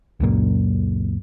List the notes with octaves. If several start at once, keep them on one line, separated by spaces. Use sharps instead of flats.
C#2 F#2 A#2